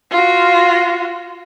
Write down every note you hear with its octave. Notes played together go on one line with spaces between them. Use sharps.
F4 F#4